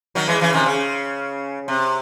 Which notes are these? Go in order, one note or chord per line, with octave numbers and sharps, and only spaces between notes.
D#3 F#3
E3 G#3
C#3 E3
C3 D#3
C#3
C3